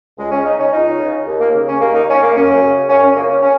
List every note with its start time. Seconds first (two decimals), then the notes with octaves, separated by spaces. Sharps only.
0.18 C#2 G#3
0.31 C#4
0.44 C#3 D#4
0.59 C#4
0.71 C#2 D#4
0.98 C#3
1.26 D#2
1.39 A#3
1.53 C#3
1.66 C#4
1.80 D#2 A#3
1.94 D#4
2.07 C#3 C#4
2.22 A#3
2.35 F#2 C#4
2.62 C#3
2.88 F#2 C#4
3.03 C#4
3.15 C#3 A#3
3.30 C#4
3.42 C#4